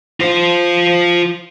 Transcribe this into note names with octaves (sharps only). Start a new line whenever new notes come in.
F4 C5